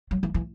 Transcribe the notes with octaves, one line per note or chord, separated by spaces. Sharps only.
F#3
E3
E3